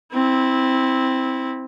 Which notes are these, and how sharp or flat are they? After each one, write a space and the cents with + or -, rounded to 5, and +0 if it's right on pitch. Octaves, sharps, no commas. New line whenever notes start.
C4 +0 E4 -20